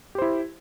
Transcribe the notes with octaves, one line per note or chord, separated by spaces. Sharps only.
E4 G4 C5